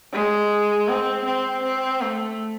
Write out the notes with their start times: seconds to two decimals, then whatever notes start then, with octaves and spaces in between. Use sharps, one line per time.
0.12 G#3
0.88 C4
1.25 C4
1.63 C4
2.01 A3